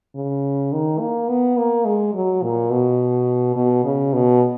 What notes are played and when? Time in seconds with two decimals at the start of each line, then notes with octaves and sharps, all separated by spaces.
0.15 C#3
0.73 D#3
1.00 A#3
1.29 B3
1.57 A#3
1.85 G#3
2.14 F#3
2.42 A#2
2.70 B2
3.56 B2
3.84 C#3
4.13 B2